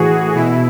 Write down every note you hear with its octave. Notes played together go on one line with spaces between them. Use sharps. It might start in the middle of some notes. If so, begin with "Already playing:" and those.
Already playing: A2 E3 F#4 G#4
B2 E4